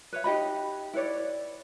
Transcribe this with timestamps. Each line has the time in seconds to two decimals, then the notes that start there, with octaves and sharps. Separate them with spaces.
0.13 B4 C#5 E5
0.24 D#4 G4 D#5 B5
0.94 E4 B4 C#5 D5